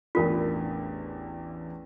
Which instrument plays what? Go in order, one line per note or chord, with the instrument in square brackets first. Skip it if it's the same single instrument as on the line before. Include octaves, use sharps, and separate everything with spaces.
[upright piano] A1 E2 D4 [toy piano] F4 A#4